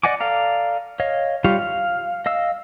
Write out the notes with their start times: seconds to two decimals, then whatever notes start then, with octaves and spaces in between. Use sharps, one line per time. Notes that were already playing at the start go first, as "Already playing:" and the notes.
0.03 D5 D#5 F#5 G#5 D6
0.20 A4 D5 F5 A#5
1.00 C#5 D#5 F5
1.44 G3 F4 G4 C#5 F5
1.59 F5
2.26 D#5 F5 E6